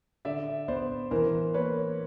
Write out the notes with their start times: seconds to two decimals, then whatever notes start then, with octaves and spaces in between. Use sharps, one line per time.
0.25 D3 D5 E5
0.68 B3 C5 D5
1.11 E3 A#4 C5
1.54 A#3 B4 C#5